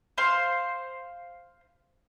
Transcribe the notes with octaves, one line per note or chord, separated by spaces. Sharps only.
C5 F5 C6